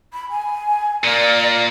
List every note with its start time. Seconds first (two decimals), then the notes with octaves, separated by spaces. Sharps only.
0.14 B5
0.30 G#5
1.04 A#2 A#3 D5